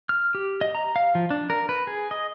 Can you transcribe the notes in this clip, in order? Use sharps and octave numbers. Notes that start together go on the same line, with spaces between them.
F6
G4
D#5
A#5
F5
F3
D4
A#4
B4
G#4
D#5